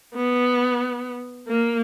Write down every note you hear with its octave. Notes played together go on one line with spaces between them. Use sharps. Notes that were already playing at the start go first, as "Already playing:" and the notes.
B3
A#3